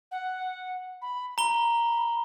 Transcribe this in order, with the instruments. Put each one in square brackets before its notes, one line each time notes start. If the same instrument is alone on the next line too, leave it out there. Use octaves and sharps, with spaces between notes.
[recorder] F#5
B5
[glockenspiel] A#5 G7 [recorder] B5